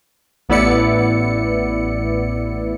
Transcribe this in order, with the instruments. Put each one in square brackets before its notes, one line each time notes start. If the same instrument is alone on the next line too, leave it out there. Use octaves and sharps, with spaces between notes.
[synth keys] A1 B3 E4 D5 C#7